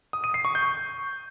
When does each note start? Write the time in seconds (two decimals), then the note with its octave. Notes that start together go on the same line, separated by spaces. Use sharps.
0.13 D#6
0.24 D#7
0.34 C7
0.45 C#6
0.55 G6